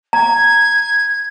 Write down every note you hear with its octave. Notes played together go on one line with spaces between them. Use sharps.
A#5 G#6